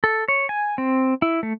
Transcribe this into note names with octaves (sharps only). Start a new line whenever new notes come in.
A4
C#5
G#5
C4
E4
A3